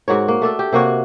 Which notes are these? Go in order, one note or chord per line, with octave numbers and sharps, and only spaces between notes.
G#2 F#4 A#4 C#5
A#3
A3 D4 A4
G4
C3 A#3 F#4 C#5